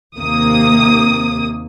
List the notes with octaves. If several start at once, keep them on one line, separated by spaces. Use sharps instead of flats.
D#2 C3 A#3 D#6